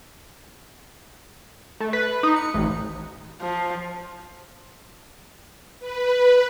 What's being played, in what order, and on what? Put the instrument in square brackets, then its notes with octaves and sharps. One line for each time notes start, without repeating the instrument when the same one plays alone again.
[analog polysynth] A3
B4
D#4
C#7
A1
[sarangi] F3
[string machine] B4